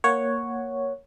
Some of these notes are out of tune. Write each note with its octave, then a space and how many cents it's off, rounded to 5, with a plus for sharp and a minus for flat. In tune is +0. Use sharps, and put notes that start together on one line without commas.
A#3 +0 C#5 +0 F#5 +0